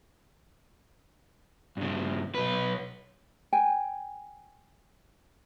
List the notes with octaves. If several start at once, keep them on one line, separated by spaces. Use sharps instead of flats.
G2 C#3
B1 B4
G5 G#5